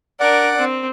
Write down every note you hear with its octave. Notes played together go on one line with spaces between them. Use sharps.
D4 A#4 D5 F#5
C4